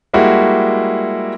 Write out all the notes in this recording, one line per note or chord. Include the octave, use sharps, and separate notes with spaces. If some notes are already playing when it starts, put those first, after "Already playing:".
G3 G#3 A#3 E4 F#4 G4